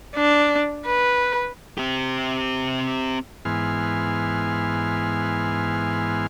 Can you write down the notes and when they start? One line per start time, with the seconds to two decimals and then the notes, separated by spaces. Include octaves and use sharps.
0.16 D4
0.86 B4
1.78 C4 G4
3.45 G#2 E3 B3 G#5 C6 F6